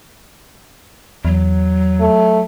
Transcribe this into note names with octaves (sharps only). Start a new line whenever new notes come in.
E2 F#3
A3